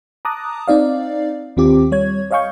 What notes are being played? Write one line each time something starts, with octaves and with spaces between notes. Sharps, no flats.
A5 A#5 D6 D#6 F#6
C4 D#4 D5 F5
D#2 D#3 C4 F4 G4 D6
G3 C#5 G#6
C#5 D#5 F5 G#5 C#6 G6